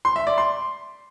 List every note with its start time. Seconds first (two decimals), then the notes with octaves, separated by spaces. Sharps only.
0.05 C6
0.16 E5
0.27 D5
0.38 C6